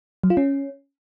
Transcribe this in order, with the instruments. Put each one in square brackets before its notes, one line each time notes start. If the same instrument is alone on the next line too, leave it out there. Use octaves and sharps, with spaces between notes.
[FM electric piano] F#3
F4
C#4